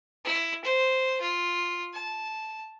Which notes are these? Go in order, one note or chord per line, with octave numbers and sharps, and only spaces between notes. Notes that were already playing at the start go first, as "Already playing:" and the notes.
E4
C5
F4
A5